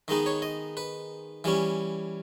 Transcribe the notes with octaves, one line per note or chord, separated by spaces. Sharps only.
D#3 G#3 B3 D#4 D#5
C#5
D#5
B4
E3 G3 C#4